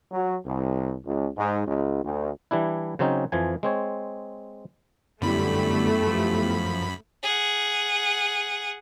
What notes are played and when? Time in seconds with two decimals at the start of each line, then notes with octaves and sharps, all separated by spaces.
0.12 F#3
0.45 C2
1.05 C#2
1.36 G#2
1.66 C#2
2.03 D2
2.51 E3 G3 D4 E4
2.99 C#3 F#3 C4 C#4 D#4
3.32 F2 E3 F3 G#5
3.63 G#3 C4 C#5
5.22 F#2 D3 G3 A3 B3 E4 G4 B5
6.07 F3
7.23 G#4 F#5